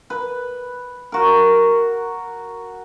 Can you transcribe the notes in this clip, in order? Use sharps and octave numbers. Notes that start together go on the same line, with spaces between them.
B4
F#4 A#4